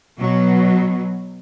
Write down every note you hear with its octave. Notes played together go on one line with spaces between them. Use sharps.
B2 F#3